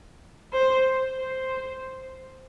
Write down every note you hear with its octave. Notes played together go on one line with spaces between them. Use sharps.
C5
C5